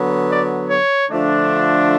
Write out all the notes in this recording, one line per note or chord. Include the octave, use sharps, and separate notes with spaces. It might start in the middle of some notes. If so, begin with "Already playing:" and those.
Already playing: D3 F#3 B3
D5
C#5
D3 F3 A3 D4 F4